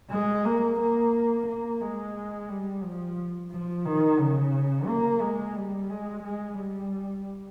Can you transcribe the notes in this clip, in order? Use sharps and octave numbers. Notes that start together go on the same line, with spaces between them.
G#3
A#3
A#3
A#3
G#3
G3
F3
F3
D#3
C#3
A#3
G#3
G3
G#3
G#3
G3